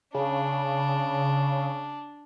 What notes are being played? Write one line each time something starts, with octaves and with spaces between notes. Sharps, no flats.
C#3 D4